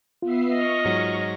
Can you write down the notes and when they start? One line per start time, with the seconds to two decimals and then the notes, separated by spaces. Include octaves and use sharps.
0.22 B3 F4 E5 C7
0.53 D#5 C#6 F6
0.85 G#2 F#3 A#6